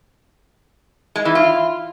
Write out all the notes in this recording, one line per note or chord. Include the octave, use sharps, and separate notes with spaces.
G#3
E3
F4